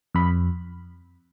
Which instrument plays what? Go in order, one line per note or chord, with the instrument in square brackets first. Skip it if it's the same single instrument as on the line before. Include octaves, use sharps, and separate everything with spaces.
[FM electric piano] F2 B5